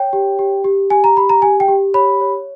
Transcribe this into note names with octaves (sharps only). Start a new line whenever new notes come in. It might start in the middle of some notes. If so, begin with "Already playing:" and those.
Already playing: C#5 G5
G4
G4
G4
G4 G#5
A#5
G4 B5
A#5
G4 G#5
G5
G4
C#5 B5
C#5